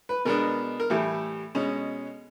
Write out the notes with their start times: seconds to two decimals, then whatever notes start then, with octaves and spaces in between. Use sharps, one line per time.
0.09 B4
0.25 B2 G#3 B3 D4 A#4
0.80 A#4
0.90 A2 E3 G3 A4
1.55 B2 G#3 C#4